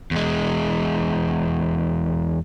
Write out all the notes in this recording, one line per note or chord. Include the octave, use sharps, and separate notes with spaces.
E2 G#3